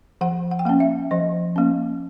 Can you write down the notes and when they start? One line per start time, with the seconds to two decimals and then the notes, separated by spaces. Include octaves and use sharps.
0.21 F3 F#5
0.51 F#5
0.59 G5
0.65 A#3 C#4 F#5
0.80 E5
1.11 F3 D#5
1.56 A#3 C#4